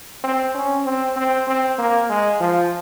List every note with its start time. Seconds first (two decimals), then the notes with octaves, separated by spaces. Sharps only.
0.24 C4
0.54 C#4
0.85 C4
1.16 C4
1.47 C4
1.78 A#3
2.09 G#3
2.40 F3